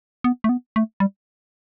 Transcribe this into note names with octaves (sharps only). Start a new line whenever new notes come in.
B3
A3
B3
A3
G3